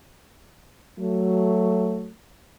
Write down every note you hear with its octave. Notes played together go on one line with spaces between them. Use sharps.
F#3 A3